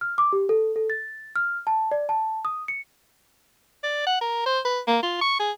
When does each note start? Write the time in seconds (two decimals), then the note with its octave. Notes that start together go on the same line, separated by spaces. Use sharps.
0.01 F6
0.18 D6
0.33 G4
0.49 A4
0.76 A4
0.90 A6
1.36 F6
1.67 A5
1.91 D5
2.09 A5
2.45 D#6
2.68 C#7
3.83 D5
4.07 F#5
4.21 A#4
4.46 C5
4.65 B4
4.87 A#3
5.03 F4
5.21 C#6
5.40 G#4